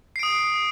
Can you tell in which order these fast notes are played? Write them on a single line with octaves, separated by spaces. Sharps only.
C7 D7 D#6